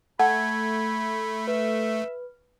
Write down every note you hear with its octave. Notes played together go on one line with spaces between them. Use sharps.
A3 F#5 A5 B5 G#6
B4 E5